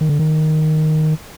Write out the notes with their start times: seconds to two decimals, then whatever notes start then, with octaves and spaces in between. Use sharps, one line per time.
0.01 D#3
0.09 D3
0.19 D#3